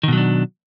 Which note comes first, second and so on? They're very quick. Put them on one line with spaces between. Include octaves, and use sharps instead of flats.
D#3 B2 F#3 D4